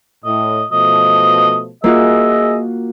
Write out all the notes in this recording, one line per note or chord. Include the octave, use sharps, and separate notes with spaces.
A2 D#5
B2 F3 A3 D#5
A#3 F4 F#4 G#4 D#5 E5